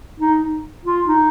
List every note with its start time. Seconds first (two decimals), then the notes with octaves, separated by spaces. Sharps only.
0.20 D#4
0.85 F4
1.07 D#4